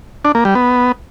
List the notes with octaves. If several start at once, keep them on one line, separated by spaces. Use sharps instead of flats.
D4
A#3
G3
B3